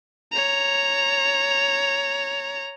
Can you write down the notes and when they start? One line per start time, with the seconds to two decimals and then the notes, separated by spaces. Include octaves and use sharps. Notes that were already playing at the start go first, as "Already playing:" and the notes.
0.32 C#5 A#5